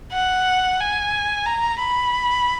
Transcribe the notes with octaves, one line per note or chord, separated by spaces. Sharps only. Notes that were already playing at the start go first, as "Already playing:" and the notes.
F#5
G#5
A#5
B5